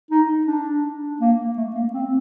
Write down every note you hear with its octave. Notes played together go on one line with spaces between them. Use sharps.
D#4
D4
A#3
A3
A#3
C4